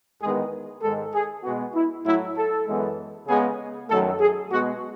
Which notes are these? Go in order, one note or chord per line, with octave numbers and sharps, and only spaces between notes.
E2 D#3 G#3 B3 G#4
G#2 D#3 G#3 A4
G#4
B2 G#3 B3 F#4
E4
A2 F#3 A3 E4
A4
F#2 E3 G#3 B3
C#3 G#3 B3 G#4
F#2 D#3 F#3 A3 A4
G#4
B2 G#3 B3 F#4